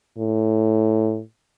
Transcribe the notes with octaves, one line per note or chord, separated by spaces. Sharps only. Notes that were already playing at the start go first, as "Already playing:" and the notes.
A2